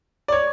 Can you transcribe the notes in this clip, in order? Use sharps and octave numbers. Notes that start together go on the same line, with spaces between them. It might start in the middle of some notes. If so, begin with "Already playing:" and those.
D5
C#5